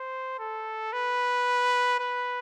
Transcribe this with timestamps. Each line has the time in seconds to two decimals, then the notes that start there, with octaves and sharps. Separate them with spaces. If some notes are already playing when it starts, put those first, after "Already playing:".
Already playing: C5
0.39 A4
0.93 B4
2.00 B4